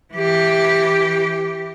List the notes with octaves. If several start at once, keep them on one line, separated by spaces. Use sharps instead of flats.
E3 G4